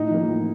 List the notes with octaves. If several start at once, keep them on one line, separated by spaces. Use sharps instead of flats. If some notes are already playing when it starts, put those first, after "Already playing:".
Already playing: A2 D#4
F3 A#3
A2